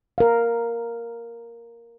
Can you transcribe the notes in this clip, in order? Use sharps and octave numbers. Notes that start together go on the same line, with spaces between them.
A#4 F5